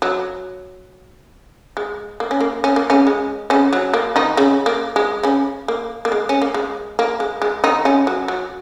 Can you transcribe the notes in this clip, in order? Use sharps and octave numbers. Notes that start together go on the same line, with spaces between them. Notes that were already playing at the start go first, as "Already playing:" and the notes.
F#3
G#3
A#3
C#4
A#3
C#4
A#3
C#3 C#4
G#3
C#3 C#4
F#3
A#3
D#3 D#4
C#3 C#4
A#3
G#3
C#3 C#4
A#3
A#3
G#3
C#4
A#3
G#3
A#3
G#3
G#3
D#3 D#4
C#3 C#4
F#3
F#3